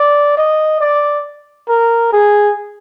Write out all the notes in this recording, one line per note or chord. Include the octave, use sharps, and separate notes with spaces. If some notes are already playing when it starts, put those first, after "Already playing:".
Already playing: D5
D#5
D5
A#4
G#4